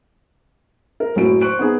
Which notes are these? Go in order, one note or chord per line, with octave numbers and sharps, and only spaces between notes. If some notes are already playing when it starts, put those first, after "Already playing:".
A#4
F#1 A2 F#3 D7
C5 C#6 F#6 D7
B3 D#4 G#4